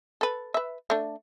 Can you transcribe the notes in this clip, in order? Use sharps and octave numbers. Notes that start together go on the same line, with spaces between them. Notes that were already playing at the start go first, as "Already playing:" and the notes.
A4 B4
B4 E5
A3 D4